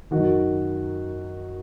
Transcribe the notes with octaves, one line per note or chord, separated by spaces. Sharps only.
F#2 D#3 F#4